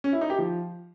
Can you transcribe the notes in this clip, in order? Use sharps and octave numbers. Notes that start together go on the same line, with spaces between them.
C#4
E4
D#4
G4
F3